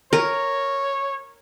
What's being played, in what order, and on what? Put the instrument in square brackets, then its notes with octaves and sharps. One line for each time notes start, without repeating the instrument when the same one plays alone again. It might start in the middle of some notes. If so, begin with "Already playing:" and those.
[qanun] A#4 [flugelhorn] C#5